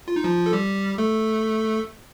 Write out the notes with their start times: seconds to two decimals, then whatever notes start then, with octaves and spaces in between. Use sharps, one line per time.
0.08 F4
0.16 D#4
0.24 F3 F4
0.46 A4
0.53 G3 G4
0.98 A3 A4